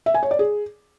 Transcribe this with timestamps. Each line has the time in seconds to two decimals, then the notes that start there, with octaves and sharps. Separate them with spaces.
0.06 E5
0.14 G#5
0.23 C#5
0.31 D5
0.39 G#4